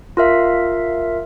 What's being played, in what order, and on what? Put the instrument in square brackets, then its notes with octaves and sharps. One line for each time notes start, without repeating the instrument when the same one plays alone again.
[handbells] F4 A#4 E5 F5